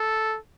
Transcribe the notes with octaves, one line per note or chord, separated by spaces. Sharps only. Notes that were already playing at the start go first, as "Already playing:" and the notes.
Already playing: A4